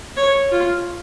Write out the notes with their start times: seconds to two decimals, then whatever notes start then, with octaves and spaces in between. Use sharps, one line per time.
0.17 C#5
0.52 F4